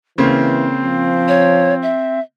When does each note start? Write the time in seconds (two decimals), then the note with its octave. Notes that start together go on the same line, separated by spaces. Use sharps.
0.18 C#3 E3 A#3 C4 C5
0.84 F3
1.28 C#5
1.83 E5